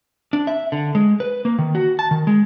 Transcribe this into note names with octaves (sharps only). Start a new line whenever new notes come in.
D4
E5
D3
G#3
B4
A#3
D#3
F#4
A5
D#3
G#3